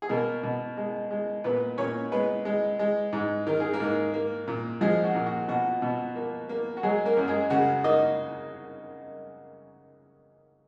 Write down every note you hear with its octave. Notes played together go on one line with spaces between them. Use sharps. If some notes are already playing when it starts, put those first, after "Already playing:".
G#4
B2 A#3 A#4
B2
G#3
G#3
A#2 B3 B4
A#2 C#4 C#5
G#3 B3 B4
G#3
G#3
G#2
D#3 A#4
G#4
A#3 A#4
G#2
A#3
A#2
F3 G#3 G#4
F#4
A#2
F#4
B2 F#4
B2
A#3
A#3
F#4
F#3 G#3 G#4
A#3 A#4
F#2
G#3 G#4
C#3 F#4
A#3 D#4 D#5